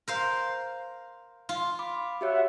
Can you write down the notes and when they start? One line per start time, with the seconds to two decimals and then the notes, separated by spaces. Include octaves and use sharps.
0.08 A#4 C5 F5
1.49 F4
1.79 B5 D6
2.21 F#4 G4 C#5 E5 F#5